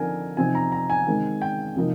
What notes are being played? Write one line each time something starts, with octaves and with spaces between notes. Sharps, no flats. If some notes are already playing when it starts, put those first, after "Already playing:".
Already playing: D3 F3 C4 D#4 A#4 G#5
C3 F3 C4 D#4 G#5
A#5
A#5
G#5
D#3 G#3 C4
G5
C3 F3 A#3 D#4